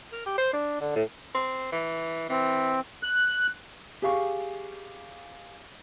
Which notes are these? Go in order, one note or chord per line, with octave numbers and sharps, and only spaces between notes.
A#4
G4
C5
D4
D3
A2
C4
E3
E3 C4
F#6
G4 G#4 F5 C#6